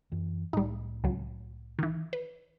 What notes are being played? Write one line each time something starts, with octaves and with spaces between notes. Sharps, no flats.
F#2 E3
C2 A2 G3 D#4
C#2 F#3
D#3 E3
B4